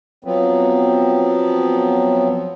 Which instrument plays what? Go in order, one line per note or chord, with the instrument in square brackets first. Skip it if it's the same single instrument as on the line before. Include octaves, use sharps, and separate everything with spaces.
[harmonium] F3 F#3 B3 C4